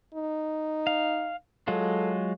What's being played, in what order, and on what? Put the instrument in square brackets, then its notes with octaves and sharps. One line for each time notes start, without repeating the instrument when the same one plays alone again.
[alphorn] D#4
[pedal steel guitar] F5
[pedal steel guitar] F#3 G#3 F4 [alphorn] A4